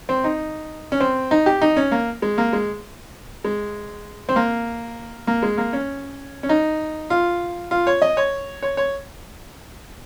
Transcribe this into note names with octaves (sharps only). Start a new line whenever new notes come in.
C4
D#4
C#4
C4
D#4
G4
D#4
C#4
A#3
G#3
A#3
G#3
G#3
C4
A#3
A#3
G#3
A#3
C#4
C#4
D#4
F4
F4
C#5
D#5
C#5
C#5
C#5